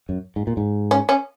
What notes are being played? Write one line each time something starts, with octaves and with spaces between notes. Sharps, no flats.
F#2
G#2
A#2
G#2
C#4
C#4